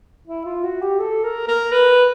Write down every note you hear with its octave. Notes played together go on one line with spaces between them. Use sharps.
E4
F4
F#4
G4
A4
A#4
A#4
B4